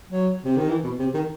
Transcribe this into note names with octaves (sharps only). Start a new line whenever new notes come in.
F#3
C3
D#3
E3
B2
C3
D#3